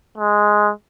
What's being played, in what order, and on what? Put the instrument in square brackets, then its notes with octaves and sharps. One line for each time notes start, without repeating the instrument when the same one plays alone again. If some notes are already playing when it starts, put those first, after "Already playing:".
[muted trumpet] G#3